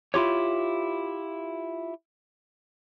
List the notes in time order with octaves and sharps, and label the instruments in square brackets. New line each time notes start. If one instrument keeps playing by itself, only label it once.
[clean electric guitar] E4 F4 G4 C#5